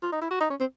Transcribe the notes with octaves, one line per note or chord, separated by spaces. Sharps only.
F4
D#4
E4
F#4
D#4
C#4
C4